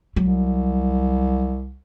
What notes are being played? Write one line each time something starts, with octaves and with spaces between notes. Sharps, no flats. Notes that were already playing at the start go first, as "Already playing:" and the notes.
C2 F#3